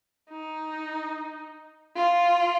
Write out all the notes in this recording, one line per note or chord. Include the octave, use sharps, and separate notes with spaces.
D#4
F4